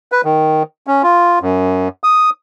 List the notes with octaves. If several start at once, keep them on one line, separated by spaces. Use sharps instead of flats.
B4
D#3
C#4
F4
F#2
D#6